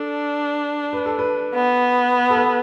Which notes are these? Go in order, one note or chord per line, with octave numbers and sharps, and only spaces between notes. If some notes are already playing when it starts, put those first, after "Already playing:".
Already playing: D4 A4
B4
A4
B4
B3
A4
B4